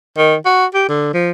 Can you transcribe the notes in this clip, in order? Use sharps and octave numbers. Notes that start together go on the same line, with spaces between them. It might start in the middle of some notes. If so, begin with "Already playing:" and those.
D#3
F#4
G4
D3
F3